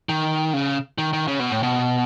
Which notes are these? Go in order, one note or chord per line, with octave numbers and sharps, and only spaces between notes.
D#3
C#3
D#3
D#3
C#3
B2
A2
B2